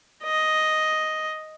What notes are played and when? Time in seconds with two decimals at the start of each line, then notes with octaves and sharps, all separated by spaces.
0.24 D#5